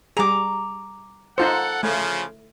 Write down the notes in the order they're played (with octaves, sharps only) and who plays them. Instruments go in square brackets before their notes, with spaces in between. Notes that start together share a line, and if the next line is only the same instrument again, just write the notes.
[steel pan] G3 G#4 [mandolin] A#5 D6
[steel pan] D#4 F4 C5 [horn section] A4 F#5
[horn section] C#3 F3 [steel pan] A3